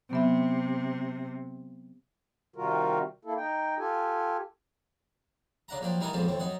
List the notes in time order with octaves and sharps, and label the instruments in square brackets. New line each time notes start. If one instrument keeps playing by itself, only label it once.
[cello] C3 [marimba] F#3 B3 E5
[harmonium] C3 D#3 G3 F4 F#4 A#4
A#3 E4 A4
D#4 G5
F4 G4 A4 G#5
[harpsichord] C#3 D4 F#5 A#5
A#1 F3 F#3 D4 G5
E3 G3 D#4 A#4 F#5 G#5
F2 A#2 F3 G#3 B3 F#4
A#1 D#2 A3 C4
F#2 D#4 F#5